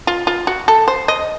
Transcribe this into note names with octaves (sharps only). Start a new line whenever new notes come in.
F4
F4
F#4
A4
C5
D#5